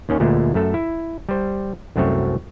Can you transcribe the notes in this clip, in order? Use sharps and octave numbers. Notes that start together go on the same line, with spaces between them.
D#2 D#3 C#4
D2 A#2 D3 G#3 A3
F#2 A3 A4
E4
G3 C5
C2 F#2 F#3 A3 C4 C#5